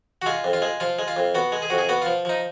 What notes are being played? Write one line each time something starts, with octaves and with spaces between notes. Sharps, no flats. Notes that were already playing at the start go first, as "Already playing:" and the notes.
F#4
G#3 F4
F2
F4
G#3
F3 F4
G#3
F4
F2
B3 F#4
G#3
G#4
F2 F#4
G#4
B3 F#4
F4
F3
F3 D#4